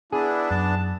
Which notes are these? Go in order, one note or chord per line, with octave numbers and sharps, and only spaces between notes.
B3 D4 E4 G#4
F#2 A5